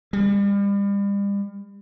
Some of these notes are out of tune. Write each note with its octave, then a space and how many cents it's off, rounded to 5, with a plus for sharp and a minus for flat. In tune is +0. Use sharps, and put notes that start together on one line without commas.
G3 +40